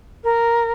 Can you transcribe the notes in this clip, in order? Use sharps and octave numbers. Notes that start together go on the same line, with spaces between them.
A#4